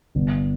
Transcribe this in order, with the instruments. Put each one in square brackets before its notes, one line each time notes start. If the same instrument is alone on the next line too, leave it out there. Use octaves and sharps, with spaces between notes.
[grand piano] G1